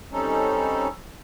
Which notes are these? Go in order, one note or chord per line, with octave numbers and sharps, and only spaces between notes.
G3 C4 C#4 D#4 A4